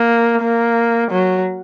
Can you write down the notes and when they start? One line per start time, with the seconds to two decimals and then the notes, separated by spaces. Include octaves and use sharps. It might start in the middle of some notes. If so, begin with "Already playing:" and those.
Already playing: A#3
0.42 A#3
1.11 F#3